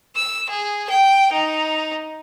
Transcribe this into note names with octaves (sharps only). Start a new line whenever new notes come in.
E6
G#4
G5
D#4